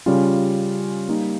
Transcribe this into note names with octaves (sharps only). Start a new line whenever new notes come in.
C#3 G3 C#4 F4
G3 A#3 D#4